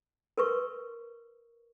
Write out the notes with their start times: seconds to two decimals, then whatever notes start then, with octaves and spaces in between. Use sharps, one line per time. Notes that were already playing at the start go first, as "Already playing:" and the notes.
0.38 A#4 B4 C#6